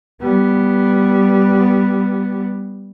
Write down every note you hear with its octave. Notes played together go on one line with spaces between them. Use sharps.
G3 B3